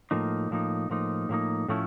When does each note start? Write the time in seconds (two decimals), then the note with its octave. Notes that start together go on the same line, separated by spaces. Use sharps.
0.11 A2 F3 A#3 D#4
0.50 A2 F3 A#3 D#4
0.90 A2 F3 A#3 D#4
1.29 A2 F3 A#3 D#4
1.68 A2 F3 A3 C#4 E4